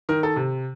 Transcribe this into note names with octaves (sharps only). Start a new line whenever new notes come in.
D#3 A#4
A4
C3